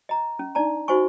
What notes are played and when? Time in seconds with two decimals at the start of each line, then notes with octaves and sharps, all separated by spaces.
0.09 D#5 A#5
0.39 C#4
0.55 D4 D#4 D5 A5 A#5
0.88 D#4 F#4 C5 D#5 G#5 C#6